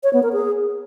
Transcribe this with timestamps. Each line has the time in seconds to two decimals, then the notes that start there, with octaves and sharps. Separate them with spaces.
0.03 C#5
0.13 B3
0.23 A#4
0.33 G#4